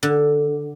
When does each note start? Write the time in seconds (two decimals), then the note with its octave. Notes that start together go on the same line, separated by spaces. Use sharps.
0.03 D3